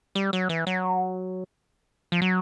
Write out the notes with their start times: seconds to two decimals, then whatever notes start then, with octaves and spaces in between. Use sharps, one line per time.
0.15 G3
0.33 F#3
0.49 E3
0.67 F#3
2.12 F3
2.22 F#3